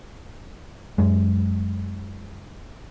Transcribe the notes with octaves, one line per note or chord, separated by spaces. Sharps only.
F#2 G#3